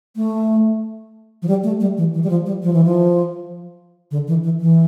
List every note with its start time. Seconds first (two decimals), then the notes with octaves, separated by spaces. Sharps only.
0.16 A3
1.42 F3
1.48 G3
1.64 A3
1.80 G3
1.97 E3
2.14 E3
2.23 G3
2.30 F3
2.46 G3
2.63 F3
2.73 E3
2.85 F3
4.11 D3
4.28 E3
4.44 E3
4.60 E3